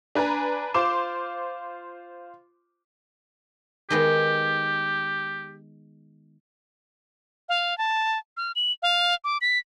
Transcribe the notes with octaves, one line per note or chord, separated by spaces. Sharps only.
D4 B4 G#5 A#5
F4 C5 C6 D6 E7
D#3 G#3 B3 G4
F5
A5
F6
F#7
F5
D6
B6